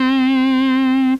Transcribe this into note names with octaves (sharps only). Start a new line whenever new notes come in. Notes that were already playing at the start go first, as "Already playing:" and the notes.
Already playing: C4